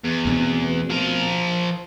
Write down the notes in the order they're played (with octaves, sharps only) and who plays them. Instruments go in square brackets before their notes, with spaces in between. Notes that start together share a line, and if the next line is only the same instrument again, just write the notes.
[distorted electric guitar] E2
[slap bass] D2 B2 C4
[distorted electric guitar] F3 A#4